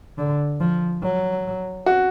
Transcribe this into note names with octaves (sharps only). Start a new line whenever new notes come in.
D3
F3
F#3
F#4